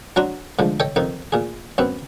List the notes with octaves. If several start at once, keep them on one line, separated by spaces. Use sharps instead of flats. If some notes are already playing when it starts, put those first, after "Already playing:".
F#3 D4 F#4 A#5 C6
G#2 D3 F3
A4 C#5 D#5 G5
F2 D#3 D#4
A#2 G#4
F#2 B3 C4